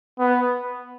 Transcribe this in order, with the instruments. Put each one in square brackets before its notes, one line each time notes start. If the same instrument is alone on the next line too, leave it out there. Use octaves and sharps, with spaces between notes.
[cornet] B3